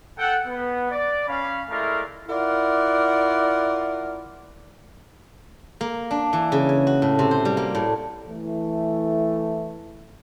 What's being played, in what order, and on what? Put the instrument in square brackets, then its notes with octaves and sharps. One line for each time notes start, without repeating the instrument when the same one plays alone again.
[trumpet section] A4 F#5 G5
B3
D5
C#4 F5 B5
G#3 A3 E4 A#4 D5 F5
[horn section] E4 F4 A#4 D5 F#5
[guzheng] A#3
D4
E3
C#3
G#5
F#4
A2
C3
C5
G3
A#3
A2
[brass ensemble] E3 A3